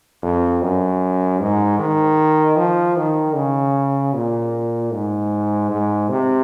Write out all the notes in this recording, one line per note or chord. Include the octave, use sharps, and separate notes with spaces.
F2
F#2
G#2
D#3
F3
D#3
C#3
A#2
G#2
G#2
C3